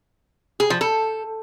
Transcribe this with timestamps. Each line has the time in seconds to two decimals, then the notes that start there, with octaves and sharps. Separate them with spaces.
0.60 G#4
0.70 F3
0.81 A4